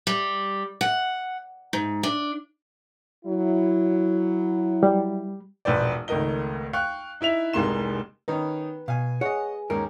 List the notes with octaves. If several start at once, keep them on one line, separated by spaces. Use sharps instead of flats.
G3
F#5
G#2
D4
F#3 E4
G3
E1 A#1 B4 C5 D5
G#1 C#2 A3 A#4 D#5 G7
F5 G5 C#6 F#6
D#4 E4 E5 F7
F1 C2 G#3 A#3 C6 E7
D#3 C#4 D#4 B4
B2 F5 G#5
G#4 C#5 D#5 F#5
D#2 G#2 C#4 A#4